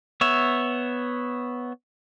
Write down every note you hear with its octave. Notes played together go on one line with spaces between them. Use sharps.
B3 C#5 E5